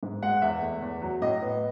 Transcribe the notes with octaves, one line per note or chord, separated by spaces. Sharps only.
G#2
G#3 F#5
E2 E5
A3
E2
F#3
A2 D#5
B3